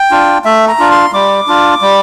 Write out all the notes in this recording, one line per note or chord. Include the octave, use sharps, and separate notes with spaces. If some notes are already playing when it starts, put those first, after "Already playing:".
Already playing: G5
D4 F4
A3 E5
A#5
D4 F4
C6
G3 D6
D4 F4
G3